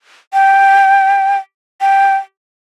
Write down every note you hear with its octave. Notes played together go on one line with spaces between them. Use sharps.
G5
G5